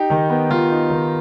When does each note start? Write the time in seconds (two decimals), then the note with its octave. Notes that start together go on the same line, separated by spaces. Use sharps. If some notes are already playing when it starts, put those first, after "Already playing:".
Already playing: D#4 G4
0.10 D#3
0.30 B3
0.50 D#3 F4
0.71 D#4
0.90 D#3